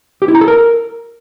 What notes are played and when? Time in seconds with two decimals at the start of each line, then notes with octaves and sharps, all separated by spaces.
0.22 G4
0.28 E4
0.35 A#5
0.41 A4
0.48 A#4